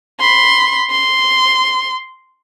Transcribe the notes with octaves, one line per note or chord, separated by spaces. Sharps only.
B5 C6
C6